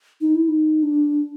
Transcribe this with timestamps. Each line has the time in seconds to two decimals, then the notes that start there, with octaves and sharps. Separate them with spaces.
0.21 D#4
0.35 E4
0.48 D#4
0.83 D4